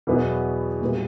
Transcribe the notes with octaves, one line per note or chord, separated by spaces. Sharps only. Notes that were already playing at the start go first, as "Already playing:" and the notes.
E2 B2 F#3 B3 E4
A#2 G3 B3